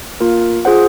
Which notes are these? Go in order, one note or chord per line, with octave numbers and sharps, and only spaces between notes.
A#3 F4 A#4 F5
F4 G#4 C5 F#5